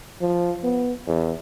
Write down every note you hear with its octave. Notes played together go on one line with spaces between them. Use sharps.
F3
B3
E2